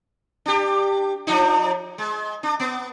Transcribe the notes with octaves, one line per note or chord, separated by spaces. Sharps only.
D4 G4
F3 D4 D#4
G#3
D4
B3